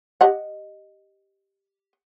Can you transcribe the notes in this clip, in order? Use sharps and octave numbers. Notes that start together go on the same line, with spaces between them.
G4 D#5 F#5